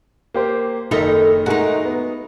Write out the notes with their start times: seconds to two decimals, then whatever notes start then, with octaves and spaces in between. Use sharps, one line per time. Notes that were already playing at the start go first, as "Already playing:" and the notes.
0.34 A#3 G4 C5
0.91 F#1 D#3 D#4 A4 E5
1.46 G#3 A3 D#4 F#4 A#4
1.85 B3